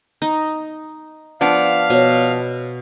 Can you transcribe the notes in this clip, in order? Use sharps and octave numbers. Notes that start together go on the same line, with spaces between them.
D#4
F3 B3 D4 F5
B2 C5 C#5